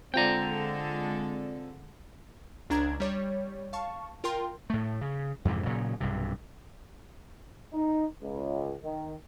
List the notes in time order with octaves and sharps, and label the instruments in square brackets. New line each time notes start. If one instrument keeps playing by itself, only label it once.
[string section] D3 G#3 A4 [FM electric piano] C4 F4 D5 [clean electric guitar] G5 A#5
[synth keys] C#2 D4 A#5 G#6
G3 C#5
F5 A5 C#6
F4 A#4 G5 C6
[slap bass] A2 A3
C#3
F2 G#2 C3 E3
A#2 C#3 F#3
B1 G2 C3
[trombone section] D#4
C#2
D#3